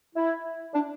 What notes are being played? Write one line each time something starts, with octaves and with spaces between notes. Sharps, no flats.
E4
D4